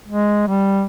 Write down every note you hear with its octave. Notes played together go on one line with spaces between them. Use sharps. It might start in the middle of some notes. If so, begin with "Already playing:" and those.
G#3
G3